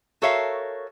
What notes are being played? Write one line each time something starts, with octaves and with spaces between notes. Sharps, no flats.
F#4 A4 A#4 C#5 E5 F5